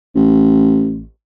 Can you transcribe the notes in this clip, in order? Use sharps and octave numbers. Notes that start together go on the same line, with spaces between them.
A1